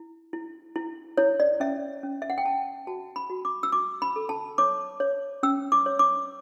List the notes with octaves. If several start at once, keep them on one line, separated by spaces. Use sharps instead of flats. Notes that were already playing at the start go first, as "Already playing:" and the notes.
Already playing: E4
E4
E4
E4 C#5
D5
C#4 E5
C#4
E5
F#5
G5
C#4 A5
F#4 A5
B5
F#4
D6
E6
F#4 D6
B5
A4
A5
C#5 D6
C#5
C#4 E6
D6
C#5
D6